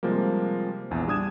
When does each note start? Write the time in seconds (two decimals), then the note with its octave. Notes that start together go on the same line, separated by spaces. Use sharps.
0.03 C3 F3 G3 G#3 A#3
0.91 A#1 E2
1.08 G3 D4 D#6 G#6 E7